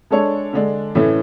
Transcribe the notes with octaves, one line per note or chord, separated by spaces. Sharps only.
G#3 D4 A4 C#5
D3 G#3 D4
A2 E3 A3 C#4